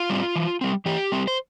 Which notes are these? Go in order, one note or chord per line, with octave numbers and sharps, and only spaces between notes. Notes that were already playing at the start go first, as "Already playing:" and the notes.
Already playing: F4
G3 C4
E3
G3 C4
E3 G4
G3 C4
C5